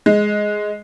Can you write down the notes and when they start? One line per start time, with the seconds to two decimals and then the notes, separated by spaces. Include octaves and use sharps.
0.06 G#3